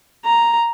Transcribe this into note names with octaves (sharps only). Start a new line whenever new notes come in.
A#5